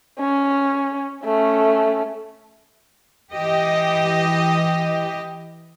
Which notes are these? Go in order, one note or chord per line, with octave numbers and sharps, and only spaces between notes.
C#4
A3 C#4
E3 G4 D#5